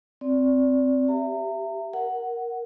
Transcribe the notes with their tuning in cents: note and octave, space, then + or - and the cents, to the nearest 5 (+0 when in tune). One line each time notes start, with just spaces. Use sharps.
C4 +0 D5 -20
G4 +0 E5 +20 A#5 -35
A#4 +0 F#5 +0